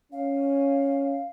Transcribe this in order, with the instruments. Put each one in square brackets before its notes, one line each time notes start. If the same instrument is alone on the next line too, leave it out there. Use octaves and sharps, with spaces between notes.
[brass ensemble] C#4 [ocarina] F5